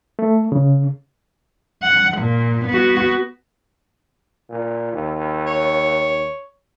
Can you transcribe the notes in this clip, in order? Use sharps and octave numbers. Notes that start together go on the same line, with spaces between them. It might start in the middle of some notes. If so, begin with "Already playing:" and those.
A3
C#3
F#5
A#2
B3 F#4
A#2
D#2
C#5